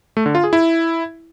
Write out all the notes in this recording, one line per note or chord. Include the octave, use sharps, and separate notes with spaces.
A3
D3
F4
G#4
E4